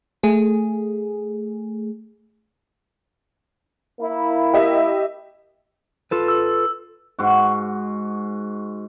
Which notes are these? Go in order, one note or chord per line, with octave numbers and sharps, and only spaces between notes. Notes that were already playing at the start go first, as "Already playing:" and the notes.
A3 G#4
A#3 E4
G4 D#5 E5
F4 A4 B4
E6
G#2 F#4